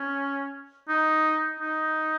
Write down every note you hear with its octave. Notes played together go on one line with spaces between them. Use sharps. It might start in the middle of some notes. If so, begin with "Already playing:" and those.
Already playing: C#4
D#4
D#4